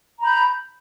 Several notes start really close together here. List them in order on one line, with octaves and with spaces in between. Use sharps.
A#5 B5 G6